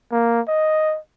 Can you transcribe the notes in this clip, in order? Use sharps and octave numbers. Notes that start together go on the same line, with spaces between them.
A#3
D#5